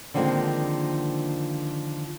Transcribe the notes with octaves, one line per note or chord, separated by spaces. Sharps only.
D3 D#3 F3 G#3 A#3 C4